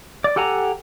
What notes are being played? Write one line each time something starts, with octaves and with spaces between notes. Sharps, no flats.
D5
G4 A4 F#5 G#5 A#5